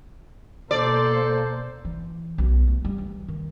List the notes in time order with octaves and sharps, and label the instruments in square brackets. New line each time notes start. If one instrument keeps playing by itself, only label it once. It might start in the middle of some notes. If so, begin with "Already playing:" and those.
[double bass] B2 A#3 [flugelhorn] A4 [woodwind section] C5 [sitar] D5
[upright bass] E3
B1
A3
G3
E3
D#3